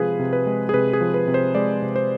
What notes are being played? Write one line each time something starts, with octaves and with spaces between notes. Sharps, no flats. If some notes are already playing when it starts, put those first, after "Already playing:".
Already playing: C3 F3 G#3 G#4 B4 F5
C3
B4
G#3
G#4
C3 B4
G#4
F3
B4
C3
C5
G#3 D5
C3
C5